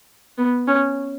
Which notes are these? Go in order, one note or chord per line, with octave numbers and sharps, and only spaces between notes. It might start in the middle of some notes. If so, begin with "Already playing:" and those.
B3
C#4